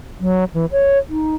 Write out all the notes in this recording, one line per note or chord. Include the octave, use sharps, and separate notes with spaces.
F#3
E3
C#5
D#4